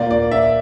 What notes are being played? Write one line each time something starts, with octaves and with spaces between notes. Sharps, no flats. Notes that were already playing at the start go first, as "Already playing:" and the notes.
Already playing: A#2 A#3 D5
D5
E5